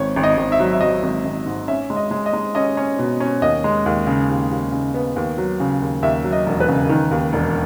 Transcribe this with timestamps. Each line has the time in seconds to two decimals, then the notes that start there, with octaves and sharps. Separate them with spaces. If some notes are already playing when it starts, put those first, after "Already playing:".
Already playing: G#1 C#5
0.16 G#1
0.23 D#5
0.37 G#1
0.52 E5
0.60 F#3
0.73 E5
0.81 F#3 D#5
1.03 G#1
1.25 G#1
1.46 G#2
1.68 C#4 E5
1.90 G#3
1.96 D#5
2.11 G#3
2.26 D#5
2.33 G#3
2.55 C#4 D#5
2.77 C#4
2.99 B2
3.20 C#4
3.42 D#2 D#5
3.64 G#3
3.86 D#2
4.07 C#3
4.29 D#2
4.51 D#2
4.72 C#3
4.94 B3
5.16 D#2
5.38 F#3
5.60 C#3
5.82 D#2
6.02 D#2 E5
6.24 F#3
6.33 D#5
6.46 E1
6.60 B4
6.68 C#3
6.89 D#3
7.11 D#2
7.33 E1